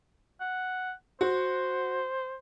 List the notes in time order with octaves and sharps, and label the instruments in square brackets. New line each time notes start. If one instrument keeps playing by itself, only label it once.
[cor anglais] F#5
[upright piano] F#4 [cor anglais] C5